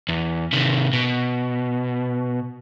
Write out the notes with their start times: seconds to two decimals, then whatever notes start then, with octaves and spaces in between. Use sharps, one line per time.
0.09 E2
0.53 C3 D#3
0.93 B2